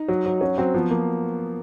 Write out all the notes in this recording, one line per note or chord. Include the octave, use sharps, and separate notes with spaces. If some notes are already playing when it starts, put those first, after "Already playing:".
Already playing: D#4
F#3
F#3
F#3 C#4
F#3 C4
F3 B3
F3 A#3